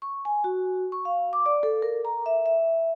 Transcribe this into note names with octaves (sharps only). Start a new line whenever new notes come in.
C#6
G#5
F#4
C#6
F5
D6
D5
A4
A#4
A#5
E5
E5